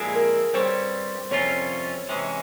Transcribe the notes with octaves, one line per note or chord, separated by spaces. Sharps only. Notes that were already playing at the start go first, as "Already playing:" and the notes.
Already playing: A#2 F3 G#3 C4 E4 G#4
A#4
G2 G3 C4 G4 C5 C#5
F2 C3 G3 C#4 F4 C#5
C3 E3 G#3 C#4